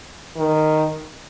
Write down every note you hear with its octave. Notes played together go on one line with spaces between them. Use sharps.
D#3